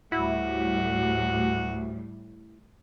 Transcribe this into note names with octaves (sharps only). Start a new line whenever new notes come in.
D2 A2 G3 E4 F#4